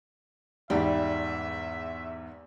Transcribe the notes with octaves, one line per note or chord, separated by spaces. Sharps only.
E2 G#2 G3 E5